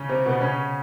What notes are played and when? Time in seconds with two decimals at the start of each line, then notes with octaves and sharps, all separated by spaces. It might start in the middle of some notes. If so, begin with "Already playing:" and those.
Already playing: C#3 C#4
0.09 C3 C4
0.26 B2 B3
0.41 C#3 C#4